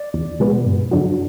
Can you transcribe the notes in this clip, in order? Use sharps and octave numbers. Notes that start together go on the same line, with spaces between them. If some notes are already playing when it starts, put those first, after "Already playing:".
Already playing: D5
E2
B2 G#3 B3
G1
F2 D3 F#3